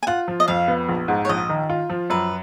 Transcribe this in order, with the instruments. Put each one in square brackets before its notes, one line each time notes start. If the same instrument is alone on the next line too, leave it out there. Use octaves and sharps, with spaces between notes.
[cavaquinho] G#5
[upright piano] F4 [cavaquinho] F#5
[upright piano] F3
[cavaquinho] D#5
[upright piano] F2 [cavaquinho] F5
[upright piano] B3
A#1
G#2
[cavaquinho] C#5
[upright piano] A#1 [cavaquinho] D#5
[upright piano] D#3
F4
F3
[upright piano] F#2 [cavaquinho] B4